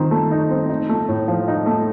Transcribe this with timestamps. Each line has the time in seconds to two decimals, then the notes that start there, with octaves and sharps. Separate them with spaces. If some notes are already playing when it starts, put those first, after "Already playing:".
Already playing: D#3 C4
0.11 A3
0.31 D#4
0.50 C4
0.70 D#4
0.89 A3
1.09 A2
1.28 F3
1.48 D#4
1.66 A3